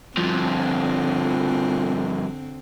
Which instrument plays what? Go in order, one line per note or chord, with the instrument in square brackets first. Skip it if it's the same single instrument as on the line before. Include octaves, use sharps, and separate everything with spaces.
[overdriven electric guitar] G2 F3 [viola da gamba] D3 C4